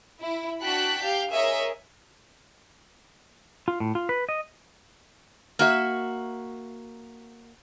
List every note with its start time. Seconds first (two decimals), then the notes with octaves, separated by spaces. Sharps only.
0.22 E4
0.63 D4 F#4 G5 A5 F#6 B6
1.01 G4 F5 G6
1.32 G#4 A#4 C#5 D#5 E5
3.68 F4
3.80 A2
3.95 F4
4.09 B4
4.29 D#5
5.59 A#3 F#4 E5